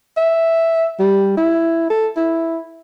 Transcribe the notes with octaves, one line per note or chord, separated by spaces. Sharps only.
E5
G3
E4
A4
E4